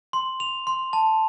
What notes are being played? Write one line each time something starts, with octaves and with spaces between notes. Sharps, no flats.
C6
F7
C6
A5